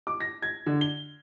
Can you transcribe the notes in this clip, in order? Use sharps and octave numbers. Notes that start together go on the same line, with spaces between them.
D6
A#6
G#6
D3
G7